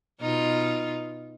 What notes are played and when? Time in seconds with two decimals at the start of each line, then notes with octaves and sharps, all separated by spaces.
0.21 B2 D#4 F4